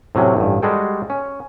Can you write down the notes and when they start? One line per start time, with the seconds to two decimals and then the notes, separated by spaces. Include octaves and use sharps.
0.15 A2 C3 F#3 C#4
0.37 A1 G2
0.62 G3 G#3 F#4 G#4 A4 G5
1.10 C#4